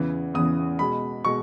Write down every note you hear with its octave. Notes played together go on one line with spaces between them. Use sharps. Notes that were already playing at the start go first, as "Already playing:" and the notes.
Already playing: E2 C#3 E3
E2 C#3 E3 D#6
B2 G#3 B5
B2 G#3 C#6